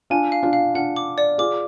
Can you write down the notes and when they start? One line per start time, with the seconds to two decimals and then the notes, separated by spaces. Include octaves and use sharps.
0.10 D4 F4 G#5
0.32 F5
0.43 D4 F4
0.53 F5
0.74 D4 F4 F#5
0.96 D6
1.18 D5
1.38 F4 G#4 D6